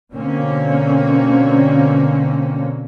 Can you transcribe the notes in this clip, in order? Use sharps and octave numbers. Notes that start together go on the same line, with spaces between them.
B2 D3 A#3 C4 C#4